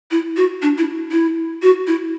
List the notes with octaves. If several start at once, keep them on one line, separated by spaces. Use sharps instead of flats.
E4
F#4
D4
E4
E4
F#4
E4